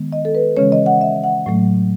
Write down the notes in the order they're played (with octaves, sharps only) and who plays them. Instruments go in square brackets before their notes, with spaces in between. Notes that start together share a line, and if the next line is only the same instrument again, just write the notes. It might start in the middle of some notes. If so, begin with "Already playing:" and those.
Already playing: [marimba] D#3 G#3 B3
D#5
A4
B4
C#3 E3 G#3 C#4 C#5
D#5
F#5
E5
F#5
A2 F#3 A3